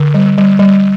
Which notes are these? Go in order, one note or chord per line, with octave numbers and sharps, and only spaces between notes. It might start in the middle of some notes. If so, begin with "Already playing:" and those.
Already playing: D3
G3
G3
G3